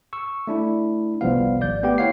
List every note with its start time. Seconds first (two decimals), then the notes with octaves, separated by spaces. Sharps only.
0.13 C#6 E6
0.47 A3 D4 E4
1.21 G1 C2 F3 G3 B3 F5
1.61 G#1 D5 G6
1.83 A3 B3 G4 G5
1.98 E4 C#5 F5 F#5 C7